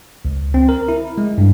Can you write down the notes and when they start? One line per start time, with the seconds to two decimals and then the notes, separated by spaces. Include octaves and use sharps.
0.25 C#2
0.54 C4
0.69 A#4
0.88 E4
1.18 G#3
1.38 G2